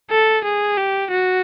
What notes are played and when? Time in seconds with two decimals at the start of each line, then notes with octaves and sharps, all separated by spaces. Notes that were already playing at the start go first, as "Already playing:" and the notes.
0.11 A4
0.44 G#4
0.77 G4
1.11 F#4